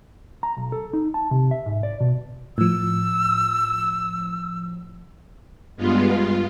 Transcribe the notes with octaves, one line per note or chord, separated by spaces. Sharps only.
A#5
B1
A4
D#4
A5
C3
E5
G#2
D5
B2
A2 F3 E6
G2 G#3 B3 F4
F4